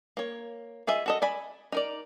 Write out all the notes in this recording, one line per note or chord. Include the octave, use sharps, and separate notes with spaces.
A#3 C#5
F4 G#4 D#5 E5
F#4 A4 D#5
D5 G#5 B5
D#4 A#4 D5